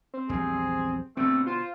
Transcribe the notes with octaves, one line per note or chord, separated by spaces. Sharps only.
C4
A#1 E2 G3 G#4
B2 D3 A3 C4
F4 C5